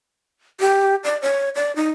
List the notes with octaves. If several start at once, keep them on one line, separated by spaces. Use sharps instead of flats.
G4
D5
C#5
D5
D#4